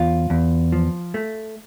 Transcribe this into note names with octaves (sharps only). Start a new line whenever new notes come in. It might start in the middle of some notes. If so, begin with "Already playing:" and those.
Already playing: E2 F4
E2
F3
A3